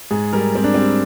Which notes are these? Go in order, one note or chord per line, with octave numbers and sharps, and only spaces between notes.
G#2 G#4
G3 A#4
G3 C4
D4
G3 C4